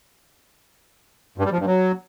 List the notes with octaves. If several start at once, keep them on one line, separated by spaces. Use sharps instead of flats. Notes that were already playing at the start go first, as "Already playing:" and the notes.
G2
G3
F3
G2
F#3